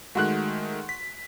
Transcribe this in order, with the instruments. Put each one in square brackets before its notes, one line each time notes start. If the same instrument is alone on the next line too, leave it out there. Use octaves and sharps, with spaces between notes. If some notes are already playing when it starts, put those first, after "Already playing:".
[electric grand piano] D#3 G#3 A3 [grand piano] F#4 C6 F#6
[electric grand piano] B6